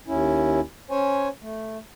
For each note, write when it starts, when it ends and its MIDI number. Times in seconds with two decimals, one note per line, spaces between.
0.07 0.60 39
0.07 0.60 61
0.07 0.60 64
0.90 1.28 61
0.90 1.28 72
0.90 1.28 73
0.90 1.28 80
1.42 1.78 57